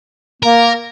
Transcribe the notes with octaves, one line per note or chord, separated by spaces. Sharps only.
A#3 A#4